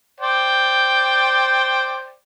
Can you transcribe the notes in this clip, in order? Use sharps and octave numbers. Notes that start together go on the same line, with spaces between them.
C5 D5 G5